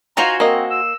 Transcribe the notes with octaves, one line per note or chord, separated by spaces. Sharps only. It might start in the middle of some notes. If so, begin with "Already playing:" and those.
D#4 F4 F#4 C5 G#5 A#5
A#3 C4 D#5
E6